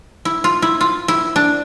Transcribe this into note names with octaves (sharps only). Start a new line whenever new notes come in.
E4
F4
E4
F4
E4
D4